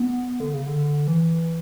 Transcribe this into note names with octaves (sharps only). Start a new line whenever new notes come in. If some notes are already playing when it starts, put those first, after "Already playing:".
Already playing: B3
D3
C#3
D3
E3